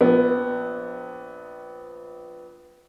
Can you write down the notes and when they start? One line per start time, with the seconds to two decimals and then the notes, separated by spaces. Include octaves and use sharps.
0.01 A#1 B3